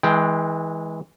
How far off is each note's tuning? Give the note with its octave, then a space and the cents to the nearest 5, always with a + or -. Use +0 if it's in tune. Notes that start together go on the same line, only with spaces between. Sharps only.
E3 -30 G#3 +0 G5 +0